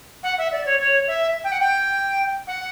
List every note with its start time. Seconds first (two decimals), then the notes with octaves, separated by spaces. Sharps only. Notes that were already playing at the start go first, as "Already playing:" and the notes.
0.23 F#5
0.38 E5
0.52 D5
0.66 C#5
0.80 C#5
1.07 E5
1.44 G5
1.52 F#5
1.60 G5
2.47 F#5